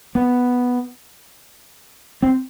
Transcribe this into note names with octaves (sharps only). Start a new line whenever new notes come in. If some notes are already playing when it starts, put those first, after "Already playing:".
B3
C4